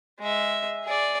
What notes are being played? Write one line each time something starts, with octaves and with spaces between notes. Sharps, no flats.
G#3 E5
G#4 D5